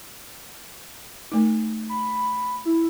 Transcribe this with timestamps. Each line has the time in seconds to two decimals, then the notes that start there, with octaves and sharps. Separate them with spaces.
1.32 A3 D#4
1.89 B5
2.65 E4